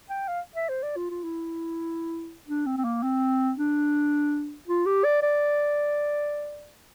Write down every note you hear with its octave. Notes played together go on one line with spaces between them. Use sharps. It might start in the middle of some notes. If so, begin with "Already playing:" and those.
G5
F5
E5
C5
D5
F4
F4
E4
D4
C4
C4
A#3
C4
D4
F4
G4
D5
D5